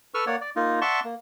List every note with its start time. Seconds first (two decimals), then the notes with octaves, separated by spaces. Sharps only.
0.14 A4 B4 C#6 E6 F6
0.27 A#3 C#5 D5 F#5
0.41 D5
0.56 A#3 D#4 F4
0.81 D5 E5 F#5 A5 C6 C#6
1.04 A#3